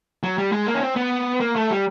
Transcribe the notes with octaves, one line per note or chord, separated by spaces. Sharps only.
F#3
G3
G#3
A#3
C#4
C4
B3
A#3
A3
G3